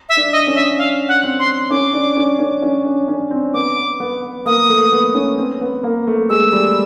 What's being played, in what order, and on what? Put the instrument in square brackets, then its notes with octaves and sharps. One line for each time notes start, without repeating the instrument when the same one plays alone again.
[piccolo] E5
[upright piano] D4
[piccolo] D#5
[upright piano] C#4
[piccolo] E5
F5
F#5
[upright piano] C4
[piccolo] C6
[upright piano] C#4 [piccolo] D6
[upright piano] D4
C#4
C#4
C#4
D4
C#4
C4
[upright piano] B3 [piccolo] D6
[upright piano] B3
[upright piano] A#3 [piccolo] D#6
[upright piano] A3
B3
C#4
C4
B3
A#3
A3
[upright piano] G#3 [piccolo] E6
[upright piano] G3